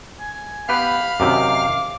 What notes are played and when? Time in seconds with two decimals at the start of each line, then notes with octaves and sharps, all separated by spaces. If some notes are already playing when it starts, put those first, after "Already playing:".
0.19 G#5
0.69 B3 G4 B4 F5 B5
1.20 F#2 C3 D#3 D6